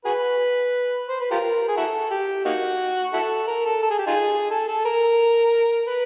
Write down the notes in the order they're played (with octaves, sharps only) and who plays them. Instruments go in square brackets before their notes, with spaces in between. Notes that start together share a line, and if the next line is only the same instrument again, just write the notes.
[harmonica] F#4 G#4 B4
C5
B4
F4 G4 A#4
G#4
E4 F#4 A4
G4
A#3 D#4 F#4
E4 F#4 A4
A#4
A4
A4
G#4
G4
D#4 F4 G#4
A4
A4
A#4
B4